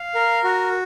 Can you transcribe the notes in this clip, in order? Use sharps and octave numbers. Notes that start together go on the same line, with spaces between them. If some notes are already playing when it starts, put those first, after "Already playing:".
Already playing: F5
A#4
F#4